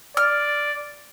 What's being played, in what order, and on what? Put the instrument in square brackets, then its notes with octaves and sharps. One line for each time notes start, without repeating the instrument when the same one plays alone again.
[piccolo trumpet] D5 [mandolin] F6